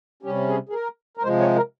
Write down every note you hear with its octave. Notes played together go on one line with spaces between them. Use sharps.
C3 G3 C#4 G4
G#4
G#4
A#4
A#4
C3 F3 G#3 C5
C#5
A#4